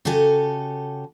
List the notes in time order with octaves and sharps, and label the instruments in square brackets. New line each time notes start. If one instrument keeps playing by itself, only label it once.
[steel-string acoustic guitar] C#3 F#4 G4 A4 G#5